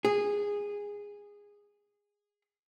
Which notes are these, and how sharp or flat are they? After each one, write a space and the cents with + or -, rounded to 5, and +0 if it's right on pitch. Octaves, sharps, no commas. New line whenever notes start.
G#4 -15